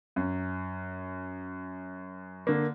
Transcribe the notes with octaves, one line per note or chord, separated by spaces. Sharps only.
F#2
D3 A#3